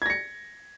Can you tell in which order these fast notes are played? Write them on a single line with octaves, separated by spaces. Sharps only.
G#6 A#6 C#7